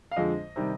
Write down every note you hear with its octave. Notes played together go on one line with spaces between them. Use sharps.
F5
F2 D3 F3 G#3 D#5
C3 D#3 G3